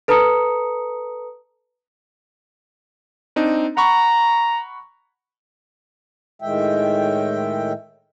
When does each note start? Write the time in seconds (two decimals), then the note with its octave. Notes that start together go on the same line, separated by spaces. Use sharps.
0.08 A4 B4 A5 A#5 D#6 C#7
3.36 C4 D4 D#4
3.77 F#5 A#5 B5 C#6
6.42 A2 D#3 G#3 E5 G5